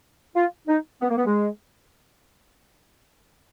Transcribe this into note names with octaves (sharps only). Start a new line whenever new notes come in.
F4
D#4
B3
A#3
B3
G#3